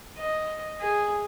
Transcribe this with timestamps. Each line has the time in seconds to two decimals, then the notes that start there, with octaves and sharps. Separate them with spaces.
0.18 D#5
0.81 G#4